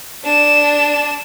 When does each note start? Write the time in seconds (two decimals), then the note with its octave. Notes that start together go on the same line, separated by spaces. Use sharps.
0.24 D4 E7